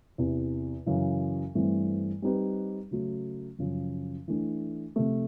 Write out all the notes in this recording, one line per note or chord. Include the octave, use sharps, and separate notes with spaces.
E2 C3 E3
F#2 C#3 E3
G2 E3 A3 C4
G3 C4 D#4 G4 B4
C#3 F#3 A3
F#2 C#3 F3
E3 A3 D4
C3 F3 A3